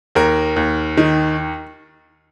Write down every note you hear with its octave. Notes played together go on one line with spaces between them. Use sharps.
D#2 A#4
D#2
D#3